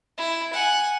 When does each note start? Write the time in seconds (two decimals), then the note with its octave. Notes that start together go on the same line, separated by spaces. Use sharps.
0.18 E4
0.53 F#5 G#5